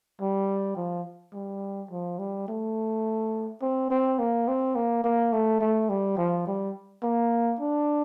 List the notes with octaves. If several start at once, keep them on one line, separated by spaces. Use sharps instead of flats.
G3
F3
G3
F3
G3
A3
C4
C4
A#3
C4
A#3
A#3
A3
A3
G3
F3
G3
A#3
D4